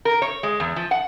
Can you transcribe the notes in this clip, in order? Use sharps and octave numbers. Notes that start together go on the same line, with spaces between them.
A#4
C#5
G#3
E2
F3
F#5